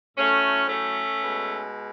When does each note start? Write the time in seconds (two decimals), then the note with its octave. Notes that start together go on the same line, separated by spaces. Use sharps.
0.17 A2 F#3 A3 C#4
0.69 A3 C#4
1.21 B2 G#3